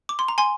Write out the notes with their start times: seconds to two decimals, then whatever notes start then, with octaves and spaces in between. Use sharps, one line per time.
0.09 D6
0.19 C6
0.28 A#5
0.38 G#5 C6